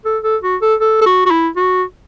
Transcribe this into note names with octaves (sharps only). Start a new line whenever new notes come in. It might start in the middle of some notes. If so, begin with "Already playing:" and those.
A4
A4
F#4
A4
A4
A4
F#4
F#4
E4
F#4